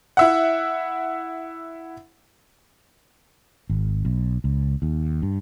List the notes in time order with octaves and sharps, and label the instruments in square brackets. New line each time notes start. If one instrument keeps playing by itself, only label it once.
[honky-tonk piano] E4 E5 F#5
[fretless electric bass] G#1
B1
C#2
D#2
G2